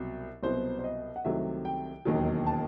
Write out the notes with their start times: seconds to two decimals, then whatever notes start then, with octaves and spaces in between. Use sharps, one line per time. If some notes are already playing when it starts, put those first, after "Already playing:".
Already playing: C2 B2 F#3
0.43 C2 B2 F#3 B3 C5
0.79 C5
0.84 D#5
1.16 F#5
1.24 C2 C3 D#3 F#3 A3 E5
1.65 G5
2.05 E1 D#2 D#3 F#3
2.46 A5